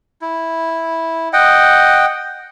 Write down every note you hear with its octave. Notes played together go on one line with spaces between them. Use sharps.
E4
D#5 F#5 G5